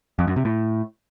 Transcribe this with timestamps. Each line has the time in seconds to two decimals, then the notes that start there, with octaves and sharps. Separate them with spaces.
0.19 F2
0.27 F#2
0.36 C3
0.45 A2